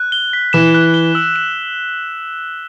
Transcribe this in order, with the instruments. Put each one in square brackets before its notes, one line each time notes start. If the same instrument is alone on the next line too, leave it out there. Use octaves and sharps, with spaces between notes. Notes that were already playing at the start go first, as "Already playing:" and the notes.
Already playing: [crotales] F#6
G7
B6
[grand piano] E3 [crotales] E7
[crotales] F#6
G7
E6
E7